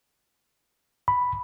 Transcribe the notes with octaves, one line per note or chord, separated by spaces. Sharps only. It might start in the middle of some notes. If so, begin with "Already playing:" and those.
B5